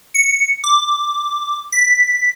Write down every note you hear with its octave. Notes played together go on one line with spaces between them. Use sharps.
C#7
D6
B6